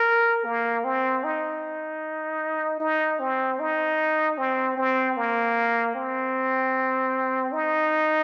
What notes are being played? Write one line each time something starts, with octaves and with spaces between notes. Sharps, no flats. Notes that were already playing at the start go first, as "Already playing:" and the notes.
Already playing: A#4
A#3
C4
D#4
D#4
C4
D#4
C4
C4
A#3
C4
D#4